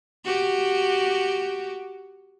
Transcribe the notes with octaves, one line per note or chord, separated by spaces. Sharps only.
F#4 G4